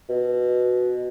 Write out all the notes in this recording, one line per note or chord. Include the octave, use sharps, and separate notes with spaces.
B2